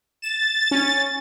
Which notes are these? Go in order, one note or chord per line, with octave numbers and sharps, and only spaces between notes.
A6 E7
C#4